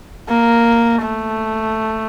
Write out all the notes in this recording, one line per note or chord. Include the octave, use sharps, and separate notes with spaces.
A#3
A3